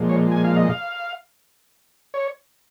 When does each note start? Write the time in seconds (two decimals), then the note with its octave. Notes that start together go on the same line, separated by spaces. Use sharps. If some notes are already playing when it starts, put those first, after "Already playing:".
Already playing: A#2 F3 G#3
0.09 C#5
0.31 G#5
0.44 F5
0.57 D#5
0.69 F5
2.14 C#5